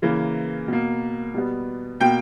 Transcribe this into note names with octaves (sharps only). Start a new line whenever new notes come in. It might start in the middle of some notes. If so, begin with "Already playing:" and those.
C#3 E3 A#3
B2 A#3
B2 G3 B3
B2 A#3 G5